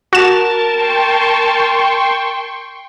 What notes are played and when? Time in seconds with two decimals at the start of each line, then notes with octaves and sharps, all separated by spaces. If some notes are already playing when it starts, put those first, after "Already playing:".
0.13 F#4 A#4 A5 E7
0.73 G5 C6 C#6